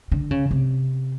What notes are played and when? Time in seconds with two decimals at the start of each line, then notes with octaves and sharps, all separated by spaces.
0.12 D3
0.31 C#3
0.51 C3